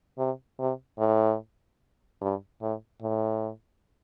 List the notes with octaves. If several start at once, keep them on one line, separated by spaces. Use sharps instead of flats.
C3
C3
A2
G2
A2
A2